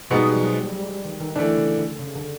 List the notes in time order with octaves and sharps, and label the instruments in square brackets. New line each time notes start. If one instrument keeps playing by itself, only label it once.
[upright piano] B2 G#3 B3 D#4 [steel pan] G3
[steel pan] G3
F3
F#3
G3
G#3
G3
G#3
G3
D#3
D#3
[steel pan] D3 [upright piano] E3 A3 D4
[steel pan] C#3
D3
C#3
D3